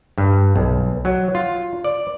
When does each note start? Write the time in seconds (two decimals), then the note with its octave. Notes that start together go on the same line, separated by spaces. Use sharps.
0.18 G2
0.56 B1
1.05 F#3
1.35 F4
1.84 D5